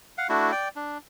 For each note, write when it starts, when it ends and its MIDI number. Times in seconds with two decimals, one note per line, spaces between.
0.18 0.27 77
0.18 0.27 78
0.29 0.51 57
0.29 0.51 62
0.29 0.51 64
0.29 0.51 66
0.52 0.68 74
0.52 0.68 79
0.76 0.98 62